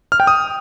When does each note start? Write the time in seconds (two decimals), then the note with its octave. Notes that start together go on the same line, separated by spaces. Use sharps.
0.12 F6
0.20 G5
0.27 D#6